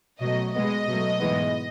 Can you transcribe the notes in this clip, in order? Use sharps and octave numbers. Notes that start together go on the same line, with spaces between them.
B2 F#3 A3 D#5
B2 G#3 B3 D#5
B2 F#3 A3
G#2 E3 G#3 B3